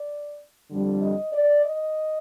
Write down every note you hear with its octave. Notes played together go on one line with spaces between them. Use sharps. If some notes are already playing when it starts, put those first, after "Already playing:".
Already playing: D5
F2 D3 G3 D4
D#5
D5
D#5